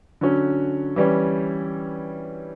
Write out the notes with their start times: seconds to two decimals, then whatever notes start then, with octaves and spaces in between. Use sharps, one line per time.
0.21 D3 F#3 C#4
0.96 E3 G3 C#4